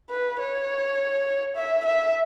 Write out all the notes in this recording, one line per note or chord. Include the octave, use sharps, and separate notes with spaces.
B4
C#5
E5
E5